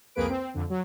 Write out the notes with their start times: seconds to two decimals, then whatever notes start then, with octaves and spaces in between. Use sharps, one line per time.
0.15 C2 F2 A#3 G#4 B4 D7
0.29 C4
0.54 F2 D3
0.69 F#3